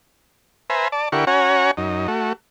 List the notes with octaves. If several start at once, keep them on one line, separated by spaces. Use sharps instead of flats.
B4 C5 E5 G#5 A#5
D5 A5
D3 E4 G4 A#4 F#5 C#6
C#4 F#4 C#5 F#5 G#5 A#5
F#2 D#4
A3 F#4